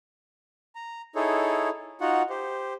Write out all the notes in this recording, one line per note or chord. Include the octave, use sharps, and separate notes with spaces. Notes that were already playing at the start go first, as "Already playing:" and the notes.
A#5
D#4 E4 G#4 A4 C#5
D#4 F4 F#4 F#5
G4 C5